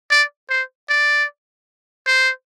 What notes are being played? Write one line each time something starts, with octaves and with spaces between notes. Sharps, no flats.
D5
C5
D5
C5